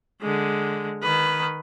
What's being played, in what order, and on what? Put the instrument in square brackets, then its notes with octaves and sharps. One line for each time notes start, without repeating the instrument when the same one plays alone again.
[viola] D3 G#3
D#3 B4